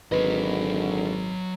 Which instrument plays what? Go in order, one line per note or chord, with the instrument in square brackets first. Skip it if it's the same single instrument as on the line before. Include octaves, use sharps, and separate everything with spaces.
[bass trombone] G#1 [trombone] D3 [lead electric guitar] F#3 D#5 [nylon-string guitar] B4